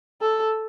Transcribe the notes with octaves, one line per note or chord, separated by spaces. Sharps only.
A4